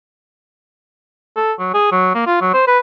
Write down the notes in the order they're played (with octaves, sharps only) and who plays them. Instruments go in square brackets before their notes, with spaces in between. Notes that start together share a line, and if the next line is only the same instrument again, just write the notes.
[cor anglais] A4
F#3
G#4
F#3
A#3
F4
F#3
C5
B4